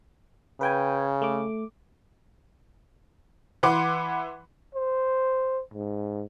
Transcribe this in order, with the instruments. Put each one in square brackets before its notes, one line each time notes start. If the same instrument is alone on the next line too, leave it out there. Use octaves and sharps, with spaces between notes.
[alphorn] C#3 [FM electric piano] B4 G5 G#5
[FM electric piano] A3 D6
[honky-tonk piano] E3 B4 F#5 C6 D6
[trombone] C5
G#2